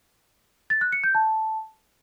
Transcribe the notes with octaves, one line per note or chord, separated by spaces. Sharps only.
A6
F#6
C#7
G6
A5